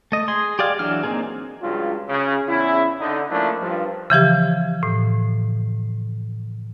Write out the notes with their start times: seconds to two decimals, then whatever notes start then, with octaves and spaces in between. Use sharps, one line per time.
0.12 A3 D#5
0.28 G#4 C6
0.59 G4 G#4 D5 F5
0.79 E3 F#3 D4 F6
1.04 A#3 C4 D#4 G#4
1.62 C#2 G2 C#3 F#3 F4
2.09 C#3
2.48 E2 C#3 C#4 E4
3.00 D3 D#4
3.30 F3 A3 A#3 C#4 D4 E4
3.61 G2 F3
4.10 C#3 E3 F3 G4
4.83 A2